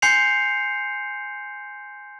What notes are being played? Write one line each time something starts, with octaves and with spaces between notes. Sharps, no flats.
G#5 C6 G6 C7 C#7 F7